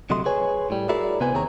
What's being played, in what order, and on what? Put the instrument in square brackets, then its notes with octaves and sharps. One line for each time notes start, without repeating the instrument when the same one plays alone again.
[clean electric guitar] D2 C3 F#3 A3 D#5 C6
G#4 B4 C#5 G#5
A2 G3
E4 F#4 G#4 A#4 D5
C3 B3 B4 C5 G#5
D#2 C4 G#4 C#5 A#5